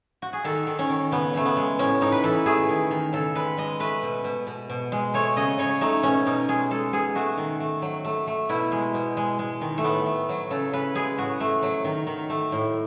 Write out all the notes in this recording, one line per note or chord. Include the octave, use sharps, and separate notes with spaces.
F#4
G#4
D#3 A4
D#3
C#4
D#3
C#3 B3
C#3 A3
B3
G#3
A2 C#4
A2 D#4
B4
E3 A4
A3 G#4
D#3
D#3
C#3 A4
G#3 B4
G#3 D#5
A3 B4
B2
B2
B2
B2
G#3
A3 C#5
C#3 D#5
C#3 C#5
A3 D#4
B2 C#4
B2 D#4
G#3 G#4
G#3 A4
B2 G#4
A3 F#4
D#3
A3
F#3
A3
A3
B2 E4
G#3
B2
G#3
G#3
D#3
A3
A2 B3
A3
F#3
C#3 A4
C#3 B4
G#3 G#4
A2 F#4
A3
F#3
D#3
D#3
A3
A2